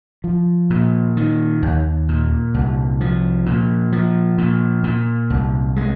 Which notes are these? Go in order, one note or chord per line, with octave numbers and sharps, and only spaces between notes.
F3
A#2
D#3
D#2
A#2
C2
F3
A#2
F3
A#2
A#2
C2
G#3